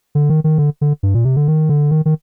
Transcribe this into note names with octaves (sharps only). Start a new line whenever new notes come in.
D3
D#3
D#3
D3
D3
G2
A#2
C3
D3
D#3
D3
D#3
D#3